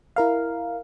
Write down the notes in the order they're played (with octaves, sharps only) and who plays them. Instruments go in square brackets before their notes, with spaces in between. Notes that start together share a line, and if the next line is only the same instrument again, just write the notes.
[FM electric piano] E4 A#4 F5